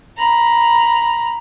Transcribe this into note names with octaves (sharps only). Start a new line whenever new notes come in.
A#5 B5